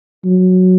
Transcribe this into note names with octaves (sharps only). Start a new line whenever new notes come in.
F#3